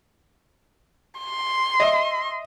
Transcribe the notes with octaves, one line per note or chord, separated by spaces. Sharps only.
C6
D#5 E5